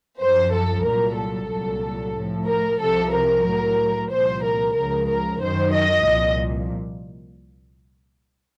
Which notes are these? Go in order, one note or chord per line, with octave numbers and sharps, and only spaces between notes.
F#2 F3 C5
A4
C2 A#2 F#3 A#4
A4
C2 A#2 F#3
A2 F3
A#4
C2 C3 F3 A4
A#4
A2 F#3
C2 A#2 F3 C5
A#4
C#2 C#3 F3 A#4
A#4
F#2 D#3 F#3 C5
D#5
C2 A#2 F3